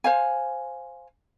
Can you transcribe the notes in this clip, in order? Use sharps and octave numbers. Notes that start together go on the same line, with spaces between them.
C5 F5 G#5